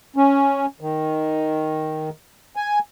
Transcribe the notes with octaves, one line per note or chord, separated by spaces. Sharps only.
C#4
D#3
G#5